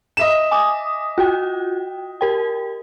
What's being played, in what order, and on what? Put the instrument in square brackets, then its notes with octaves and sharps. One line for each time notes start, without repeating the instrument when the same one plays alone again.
[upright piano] D#5 E5 E7
[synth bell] G#5 D6 D#6
F4 F#4 G5
G4 A#4 G5